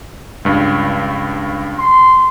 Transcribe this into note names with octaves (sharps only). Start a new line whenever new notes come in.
C#2 G2
C6